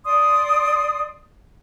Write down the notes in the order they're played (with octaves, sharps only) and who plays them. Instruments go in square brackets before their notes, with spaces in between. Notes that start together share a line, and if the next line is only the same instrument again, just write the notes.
[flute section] D5 C6 D#6